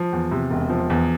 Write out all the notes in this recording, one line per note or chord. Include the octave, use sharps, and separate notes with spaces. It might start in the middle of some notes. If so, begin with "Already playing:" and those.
Already playing: F3
E2
C3
E1
F3
E2